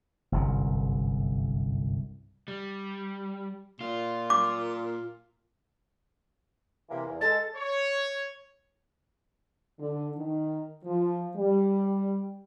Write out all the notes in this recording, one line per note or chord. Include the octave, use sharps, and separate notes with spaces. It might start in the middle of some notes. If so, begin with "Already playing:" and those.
G1 C2 F#2
G3
A#2 F4
D6
C3 E3 A#3
E2
G#3 A4 A6
C#5
D3
D#3
F3
G3